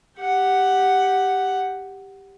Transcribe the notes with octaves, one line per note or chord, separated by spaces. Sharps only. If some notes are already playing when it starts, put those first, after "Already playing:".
G4 F#5